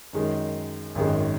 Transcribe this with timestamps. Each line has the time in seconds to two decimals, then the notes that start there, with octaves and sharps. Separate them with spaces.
0.13 F#2 D#3 G#3
0.95 G#1 F#2 D#3 G#3